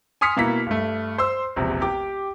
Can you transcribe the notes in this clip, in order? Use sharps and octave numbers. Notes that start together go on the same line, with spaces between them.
G#5 C6 D#6 F6 B6 C#7
B2 A#3 E4 B6
G2 A3
C5 C6 E6
E1 A#1 C3
G4 D6